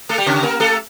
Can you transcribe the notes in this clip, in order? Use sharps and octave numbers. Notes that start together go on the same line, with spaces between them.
A3 A4
G3 G4
C#3 C#4
A#3 A#4
A3 A4